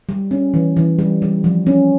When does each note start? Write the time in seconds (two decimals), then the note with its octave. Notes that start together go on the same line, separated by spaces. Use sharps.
0.09 G3
0.31 C#4
0.54 E3
0.77 E3
0.99 G3
1.22 G3
1.44 F3
1.67 C#4